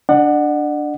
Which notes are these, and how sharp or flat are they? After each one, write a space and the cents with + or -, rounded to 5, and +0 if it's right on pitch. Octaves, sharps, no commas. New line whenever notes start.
D4 +0 D5 +40 F#5 +0